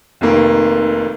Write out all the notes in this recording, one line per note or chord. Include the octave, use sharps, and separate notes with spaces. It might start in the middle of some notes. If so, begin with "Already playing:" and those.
F1 F2 C3 D#3 A#3